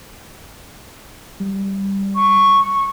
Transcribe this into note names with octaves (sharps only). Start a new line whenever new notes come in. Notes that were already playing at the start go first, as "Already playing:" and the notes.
G3
C#6